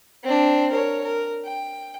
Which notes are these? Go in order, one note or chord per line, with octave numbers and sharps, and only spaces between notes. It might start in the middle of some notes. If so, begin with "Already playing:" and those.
C4 D4
A#4 C#5
A#4
G5